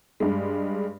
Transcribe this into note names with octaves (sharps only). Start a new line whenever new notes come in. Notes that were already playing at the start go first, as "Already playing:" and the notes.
G2 G#3